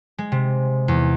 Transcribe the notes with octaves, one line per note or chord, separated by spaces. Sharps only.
G#3
C3
E2